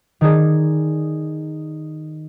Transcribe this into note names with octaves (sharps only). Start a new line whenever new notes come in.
D#3 D#4 G#4 D5